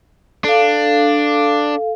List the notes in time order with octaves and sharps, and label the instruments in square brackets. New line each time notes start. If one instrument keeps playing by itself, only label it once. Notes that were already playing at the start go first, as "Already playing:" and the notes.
[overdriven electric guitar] D4 [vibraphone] A4 F5